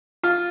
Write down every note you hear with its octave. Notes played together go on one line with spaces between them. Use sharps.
F4